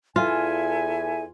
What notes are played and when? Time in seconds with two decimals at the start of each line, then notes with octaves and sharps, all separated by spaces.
0.16 E2 E4 F4 A4 E5 G#5